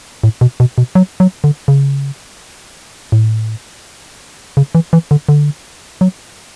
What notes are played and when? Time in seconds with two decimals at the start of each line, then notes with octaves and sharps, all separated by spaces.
0.24 A2
0.41 B2
0.60 B2
0.78 B2
0.95 F#3
1.20 F#3
1.44 D3
1.68 C#3
3.12 A2
4.57 C#3
4.75 E3
4.93 E3
5.11 D3
5.29 D3
6.01 F#3